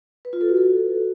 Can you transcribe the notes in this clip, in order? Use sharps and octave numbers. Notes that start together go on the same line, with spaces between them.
B4
F4
A4
F#4
A4